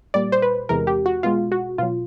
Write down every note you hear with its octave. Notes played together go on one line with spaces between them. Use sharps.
A#2 G3 D5
C5
B4
E2 C3 E3 G#3 A#4
G4
F#4
B2 G#3 F4
F#4
B2 F#3 F4